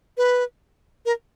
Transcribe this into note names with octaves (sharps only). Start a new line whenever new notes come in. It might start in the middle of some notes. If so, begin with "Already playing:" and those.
B4
A#4